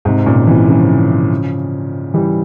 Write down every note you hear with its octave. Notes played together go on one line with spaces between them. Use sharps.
G#2 C3
A#2 C#3
C3 E3
C#3 F3
E3 G3